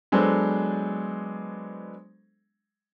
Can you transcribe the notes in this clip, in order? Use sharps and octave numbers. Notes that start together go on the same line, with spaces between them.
F#3 G#3 B3 D4 A4 C5